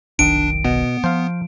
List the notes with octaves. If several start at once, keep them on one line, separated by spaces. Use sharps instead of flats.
F1 B1 D#3 D4 D7
B2 B3
F3 C5 F5